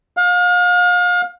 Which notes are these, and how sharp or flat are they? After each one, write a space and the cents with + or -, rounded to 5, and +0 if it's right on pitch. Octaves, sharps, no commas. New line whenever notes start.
F5 +35